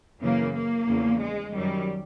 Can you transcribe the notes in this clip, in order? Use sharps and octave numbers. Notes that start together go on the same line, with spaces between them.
F#2 C#3 E3 A#3
A#3
E2 C#3 F3
G#3
F#2 D#3 F#3 G3